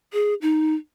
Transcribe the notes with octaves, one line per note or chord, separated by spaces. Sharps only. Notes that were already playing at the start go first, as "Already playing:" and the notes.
G#4
D#4